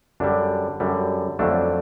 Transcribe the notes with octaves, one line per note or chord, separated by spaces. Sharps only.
F#2 D3 G3 D4
F#2 D3 G3
F2 D3 F#3 A3 D4